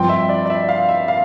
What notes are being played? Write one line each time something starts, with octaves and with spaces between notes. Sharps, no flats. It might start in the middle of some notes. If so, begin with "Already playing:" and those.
Already playing: G2 F3 C4 G5
E5
D5
D5
E5
F5
E5
F5